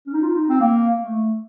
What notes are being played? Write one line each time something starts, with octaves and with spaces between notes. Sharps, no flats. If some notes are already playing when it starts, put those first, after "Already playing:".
C#4
D#4
F4
D#4
C4
A#3
A3